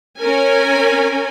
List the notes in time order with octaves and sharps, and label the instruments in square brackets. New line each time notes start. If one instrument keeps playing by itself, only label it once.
[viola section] C#4 A#4 G#5